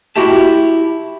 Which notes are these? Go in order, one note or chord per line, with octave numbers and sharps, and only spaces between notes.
E4 F#4 G4 E5 A5